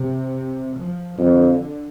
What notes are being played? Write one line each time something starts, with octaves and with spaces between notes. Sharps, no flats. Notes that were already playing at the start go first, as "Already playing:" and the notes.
Already playing: C3
F3
F2 D3